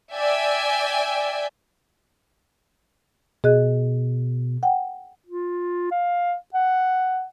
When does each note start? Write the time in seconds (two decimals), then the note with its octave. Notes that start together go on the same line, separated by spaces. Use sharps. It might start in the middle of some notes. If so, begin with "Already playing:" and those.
0.14 D5 E5 G5 G#5
3.44 B2 G#4 D#5 F#6
4.63 F#5 G5
5.26 F4
5.91 F5
6.54 F#5